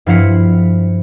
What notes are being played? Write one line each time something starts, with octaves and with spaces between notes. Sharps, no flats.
G2 F3 E4 F5 F#5 B6